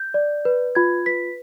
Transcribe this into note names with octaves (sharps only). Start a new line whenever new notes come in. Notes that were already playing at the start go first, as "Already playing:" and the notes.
Already playing: G6
D5
B4
F4 G#6
B4 B6